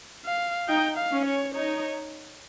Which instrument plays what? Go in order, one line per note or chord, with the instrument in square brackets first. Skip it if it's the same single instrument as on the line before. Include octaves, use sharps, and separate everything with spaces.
[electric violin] F5
[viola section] D#4 [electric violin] G5
[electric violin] F5
[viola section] C#4
[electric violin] C#5
[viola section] D#4 [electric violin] C#5